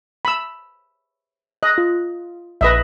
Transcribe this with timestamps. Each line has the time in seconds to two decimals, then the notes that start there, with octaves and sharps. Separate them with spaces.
0.25 B5 E6
1.63 D#5 F#6
1.78 F4
2.61 A#1 B4 D#5 E5